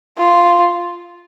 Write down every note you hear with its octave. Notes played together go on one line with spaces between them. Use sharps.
F4